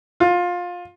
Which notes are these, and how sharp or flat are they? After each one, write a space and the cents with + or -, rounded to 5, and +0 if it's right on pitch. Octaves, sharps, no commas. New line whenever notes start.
F4 +20